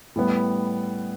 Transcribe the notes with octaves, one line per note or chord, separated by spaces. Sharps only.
A2 G3 B3